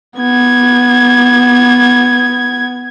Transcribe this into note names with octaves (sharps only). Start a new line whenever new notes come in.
B3 G#6